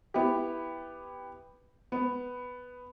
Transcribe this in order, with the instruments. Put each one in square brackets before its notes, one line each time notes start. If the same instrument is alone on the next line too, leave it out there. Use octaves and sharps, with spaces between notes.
[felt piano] B3 E4 G4
B3